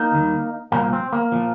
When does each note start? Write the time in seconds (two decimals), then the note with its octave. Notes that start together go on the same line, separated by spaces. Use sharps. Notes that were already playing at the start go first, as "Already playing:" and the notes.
Already playing: A#3 D#4
0.12 D#2 D#3 G3
0.72 C2 A#2 F3 A#3
0.93 C4
1.13 A#3
1.32 A#2 F3